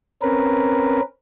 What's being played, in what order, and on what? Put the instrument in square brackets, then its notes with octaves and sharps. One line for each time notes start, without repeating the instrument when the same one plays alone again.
[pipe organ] C4 C#4 A#4 B4